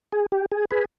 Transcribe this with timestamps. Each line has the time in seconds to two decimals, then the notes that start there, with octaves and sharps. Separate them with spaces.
0.12 G#4
0.32 G4
0.52 G#4
0.71 G#4 B4